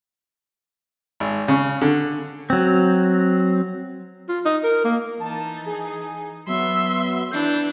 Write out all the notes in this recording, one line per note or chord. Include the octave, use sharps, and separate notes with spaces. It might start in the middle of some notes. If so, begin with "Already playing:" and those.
G#1
C#3
D3
F#3 C4
F4
D#4
A#4
A#3
E3 D#4 A5
G#4
F#3 B3 E5 C6
E3 D4 G6